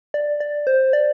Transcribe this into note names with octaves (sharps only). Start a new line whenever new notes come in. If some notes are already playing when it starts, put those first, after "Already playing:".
D5
D5
C5
D5